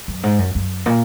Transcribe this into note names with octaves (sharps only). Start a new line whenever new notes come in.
F#2
G#2
F#2
F#2
A#2